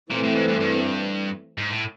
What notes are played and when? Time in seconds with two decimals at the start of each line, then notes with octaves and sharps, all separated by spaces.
0.11 A#2 E3 A3 C4
0.24 A2
0.36 G#2
0.48 G2
0.60 G2
1.58 G#2
1.71 A2